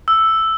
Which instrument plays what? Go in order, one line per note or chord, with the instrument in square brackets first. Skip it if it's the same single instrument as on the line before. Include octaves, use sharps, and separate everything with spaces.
[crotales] E6